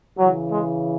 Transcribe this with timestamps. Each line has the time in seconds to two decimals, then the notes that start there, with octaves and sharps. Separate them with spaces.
0.18 C#3 E3 F#3
0.48 G#3